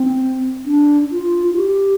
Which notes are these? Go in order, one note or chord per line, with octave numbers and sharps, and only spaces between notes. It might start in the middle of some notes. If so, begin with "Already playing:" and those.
Already playing: C4
D4
F4
F4
G4